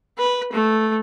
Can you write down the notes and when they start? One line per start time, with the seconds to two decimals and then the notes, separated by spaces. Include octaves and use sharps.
0.18 B4
0.52 A3